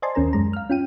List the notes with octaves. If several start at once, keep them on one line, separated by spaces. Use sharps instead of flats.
C5 D5 D#5 G#5 A5 C6
D#2 C#4 A#4 A#5
F#2 G#3 A#5
F5 F6
C#4 F4 G5 D#7